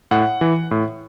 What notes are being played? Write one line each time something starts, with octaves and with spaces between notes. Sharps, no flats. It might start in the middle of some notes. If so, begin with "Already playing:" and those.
A2 F#5
E3
A2